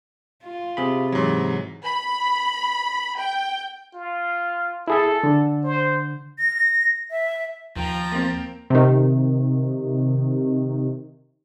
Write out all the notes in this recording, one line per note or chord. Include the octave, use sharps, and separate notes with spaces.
F4
C3 G#4 B5
G#2 E3 F#3
B5
G5
F4
E4 G#4 A4 E5
D3
C5
A#6
E5
D#2 F3 G5 A#5
A#3 C4
C3 D#3